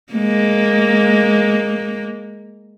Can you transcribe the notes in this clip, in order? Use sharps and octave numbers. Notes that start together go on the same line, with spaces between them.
G#3 A#3